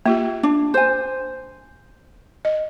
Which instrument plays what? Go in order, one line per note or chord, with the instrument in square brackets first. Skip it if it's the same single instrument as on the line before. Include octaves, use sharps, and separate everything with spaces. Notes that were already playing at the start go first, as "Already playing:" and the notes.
[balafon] A#3 F4 G4 [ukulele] E5
[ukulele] D4
C5 G#5
[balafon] D#5